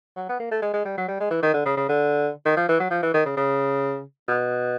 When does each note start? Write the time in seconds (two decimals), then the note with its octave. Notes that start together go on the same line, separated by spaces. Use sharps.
0.16 F#3
0.29 B3
0.39 A#3
0.51 A3
0.62 G#3
0.73 G#3
0.85 G3
0.97 F#3
1.08 G3
1.20 G#3
1.31 E3
1.43 D#3
1.54 D3
1.65 C#3
1.77 C#3
1.89 D3
2.46 D#3
2.56 F3
2.69 E3
2.80 F#3
2.90 F3
3.03 E3
3.14 D#3
3.25 C#3
3.37 C#3
4.28 B2